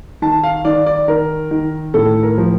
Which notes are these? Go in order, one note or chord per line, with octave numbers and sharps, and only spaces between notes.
D#3 A5
F5
D#3 D5
D5
D#3 A#4
D#3
A2 A4
A#4
F3